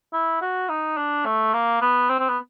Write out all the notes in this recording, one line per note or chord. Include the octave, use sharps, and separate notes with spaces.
E4
F#4
D#4
D4
A3
A#3
B3
C4
C4
B3